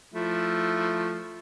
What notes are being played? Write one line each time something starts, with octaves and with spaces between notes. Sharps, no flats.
F3 A3 E4